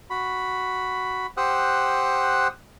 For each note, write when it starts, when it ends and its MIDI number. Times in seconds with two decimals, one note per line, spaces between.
0.10 1.27 66
0.10 1.27 83
1.37 2.48 67
1.37 2.48 72
1.37 2.48 78
1.37 2.48 87
1.37 2.48 88
1.37 2.48 90